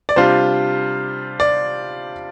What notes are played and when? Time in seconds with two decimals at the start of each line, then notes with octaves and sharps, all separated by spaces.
0.09 D5
0.16 C3 G3 D4 F4 C5
1.40 D5